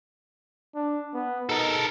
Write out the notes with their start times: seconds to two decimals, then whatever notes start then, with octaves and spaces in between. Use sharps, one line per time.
0.75 D4
1.14 B3
1.49 D#4 A4 A#4